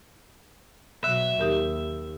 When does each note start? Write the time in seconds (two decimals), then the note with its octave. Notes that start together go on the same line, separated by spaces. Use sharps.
1.04 B2 F#3 E5 F#6
1.39 D#2 D#4 G4 A#4